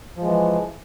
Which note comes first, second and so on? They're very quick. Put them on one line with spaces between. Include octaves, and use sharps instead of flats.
F3 G#3 E3